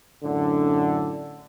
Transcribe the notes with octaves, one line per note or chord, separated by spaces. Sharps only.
F#2 A2 D3